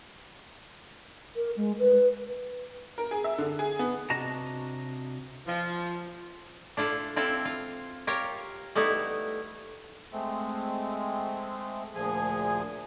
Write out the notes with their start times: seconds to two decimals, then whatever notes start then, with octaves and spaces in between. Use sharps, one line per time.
1.36 A#4
1.57 G#3
1.79 B4
2.98 A#4
3.11 G#4
3.24 E5
3.38 D3
3.59 G#4
3.79 B3
4.10 C3 D4 F#4 D#5 A5 A#5
5.47 F3
6.77 D4 E4 F4 A4
7.16 C4 E4 F4 A4 G5
7.45 F4
8.07 F4 G4 A#4 C#5
8.75 G3 A3 B3 D#4 E4
10.12 G#3 A3 C4
11.95 D2 A#2 F3 G#4 G#5